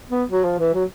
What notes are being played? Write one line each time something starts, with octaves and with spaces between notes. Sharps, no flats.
B3
F#3
F3
E3
F#3